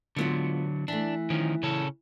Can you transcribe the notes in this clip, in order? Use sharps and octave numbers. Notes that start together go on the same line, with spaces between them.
D3 F#3 G#3 B3 F4
E3 A3 D4
D#3 F3 C#4
C#3 C#4 A4